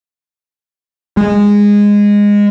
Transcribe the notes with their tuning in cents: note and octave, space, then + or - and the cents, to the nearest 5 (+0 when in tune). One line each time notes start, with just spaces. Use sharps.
G#3 -15